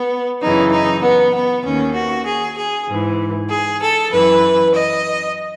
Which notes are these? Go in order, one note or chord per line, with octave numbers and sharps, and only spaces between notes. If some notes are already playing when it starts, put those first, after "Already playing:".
Already playing: B3
F#2 C#3 E3 D#4
D#4
B3
B3
D#2 D#3 C#4
F#4
G#4
G#4
G#2 E3
G#4
A4
F#2 E3 B4
D#5